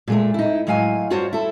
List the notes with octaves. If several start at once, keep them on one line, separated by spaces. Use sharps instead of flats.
A#2 G#3 A3
D#4 E4
A2 F#3 G#3 F5 F#5 G#5
G2 F4 F#4 C5 C#5
E4 A4